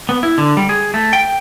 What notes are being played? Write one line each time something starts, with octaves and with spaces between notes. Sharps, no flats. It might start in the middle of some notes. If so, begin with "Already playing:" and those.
B3
E4
D3
G3
G#4
A3
G5